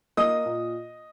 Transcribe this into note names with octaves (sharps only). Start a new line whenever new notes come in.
A#3 D#5 D#6
A#2